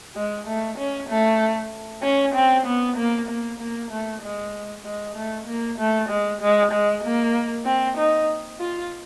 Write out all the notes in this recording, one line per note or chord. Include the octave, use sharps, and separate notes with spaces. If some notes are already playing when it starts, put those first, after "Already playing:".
G#3
A3
C#4
A3
C#4
C4
B3
A#3
A#3
A#3
A3
G#3
G#3
A3
A#3
A3
G#3
G#3
G#3
A#3
C4
D#4
F4